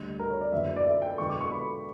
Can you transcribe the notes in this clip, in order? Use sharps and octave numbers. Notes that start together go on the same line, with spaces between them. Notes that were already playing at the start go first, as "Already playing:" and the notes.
Already playing: D2 D3 G3
A#4
C#5
D5
F#1 E2 D3 F#3 E5
D5
E5
G5
E1 E2 D3 F#3 C#6
D6
C#6
B5